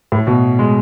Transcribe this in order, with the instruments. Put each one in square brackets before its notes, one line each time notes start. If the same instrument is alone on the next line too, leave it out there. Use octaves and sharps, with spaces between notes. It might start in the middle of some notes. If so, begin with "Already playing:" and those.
[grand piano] A2
B2
G#3